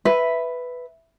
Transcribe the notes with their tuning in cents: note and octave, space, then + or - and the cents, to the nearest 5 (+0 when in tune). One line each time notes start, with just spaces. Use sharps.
B4 +5 E5 +0